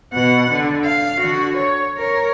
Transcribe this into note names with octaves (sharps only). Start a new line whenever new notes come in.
B2 F#5
D3
F5
D3 F#4
C#5
A#4 C#5